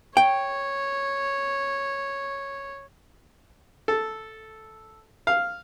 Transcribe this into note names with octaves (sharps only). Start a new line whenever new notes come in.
C#5 G5
A4
F5